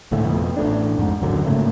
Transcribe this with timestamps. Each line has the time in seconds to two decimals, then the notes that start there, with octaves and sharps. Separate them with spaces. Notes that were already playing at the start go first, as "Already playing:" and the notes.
0.11 G#1 A2 D3 A3
0.25 F2 B2
0.57 A1 A3 D4
0.97 F2 G#2
1.20 D#1 A1 F#2 D3
1.45 G#2 C#3 A3 A#3